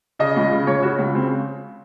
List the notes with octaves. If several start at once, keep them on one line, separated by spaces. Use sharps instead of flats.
C#3 D#5
C#2
C#3
C#2 C#5
C#3 F#4
C#2
C#3 C4